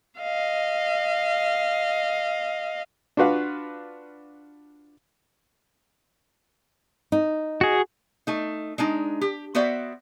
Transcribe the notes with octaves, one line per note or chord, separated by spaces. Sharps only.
D#5 F5
D4 F4 F#4 B4 F5
D#4
F#4 G#4
A3 D#4
G#3 D4 D#4
G4
B3 F#4 C5 D5 E5